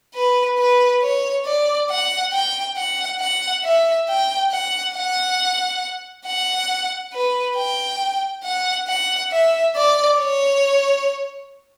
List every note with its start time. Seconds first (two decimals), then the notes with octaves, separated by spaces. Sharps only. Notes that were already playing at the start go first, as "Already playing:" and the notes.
0.15 B4
0.59 B4
1.03 C#5
1.46 D5
1.90 F#5
2.33 G5
2.77 F#5
3.20 F#5
3.64 E5
4.08 G5
4.51 F#5
4.95 F#5
6.26 F#5
7.13 B4
7.57 G5
8.44 F#5
8.88 F#5
9.31 E5
9.76 D5
10.19 C#5